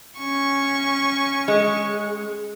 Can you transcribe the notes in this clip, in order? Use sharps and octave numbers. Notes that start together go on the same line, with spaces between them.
C#4 C#6
G#3